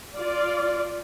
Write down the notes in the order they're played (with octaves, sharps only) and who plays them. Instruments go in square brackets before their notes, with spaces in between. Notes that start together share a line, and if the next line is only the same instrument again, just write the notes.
[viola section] F4 D5